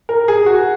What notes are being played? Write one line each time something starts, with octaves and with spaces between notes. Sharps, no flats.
A#4
G#4
F#4